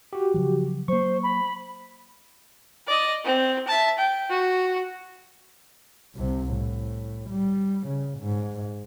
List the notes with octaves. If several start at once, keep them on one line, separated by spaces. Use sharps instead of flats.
F#4 G4
C#3 F3 F#3
F#3 A#3 C5 C#6
B5
D5 D#5
C4
E5 A5
G5
F#4
C2 C3
A2
G3
C#3
G#2